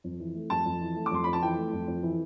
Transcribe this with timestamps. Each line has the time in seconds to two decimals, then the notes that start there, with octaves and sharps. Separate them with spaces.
0.04 F2
0.20 E3
0.35 A3
0.50 F2 A5
0.65 F2
0.80 E3
0.96 A3
1.06 D6
1.11 F2 C6
1.24 F2 B5
1.33 A5
1.42 E3 G5
1.57 A3
1.73 F2
1.88 F2
2.03 E3